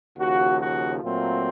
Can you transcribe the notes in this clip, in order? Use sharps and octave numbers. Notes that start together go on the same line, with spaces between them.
D#2 C#3 F3 F#4
F#4
A#2 F#3 A3 C4 F4